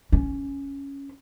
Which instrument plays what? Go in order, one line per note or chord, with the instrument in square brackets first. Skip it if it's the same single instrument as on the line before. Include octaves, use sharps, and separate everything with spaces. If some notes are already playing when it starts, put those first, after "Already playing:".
[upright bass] C#4